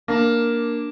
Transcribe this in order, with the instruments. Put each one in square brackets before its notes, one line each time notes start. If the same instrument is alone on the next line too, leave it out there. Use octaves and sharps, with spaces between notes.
[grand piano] A#3 [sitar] D4